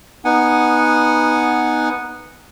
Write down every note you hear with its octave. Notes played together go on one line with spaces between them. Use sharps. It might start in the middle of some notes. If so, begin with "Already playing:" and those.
B3 D#4 F#5 G#5